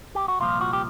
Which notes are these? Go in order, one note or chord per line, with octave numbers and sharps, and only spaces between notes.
G4
F#4
C2 A#2 F3 F4
F#4
G4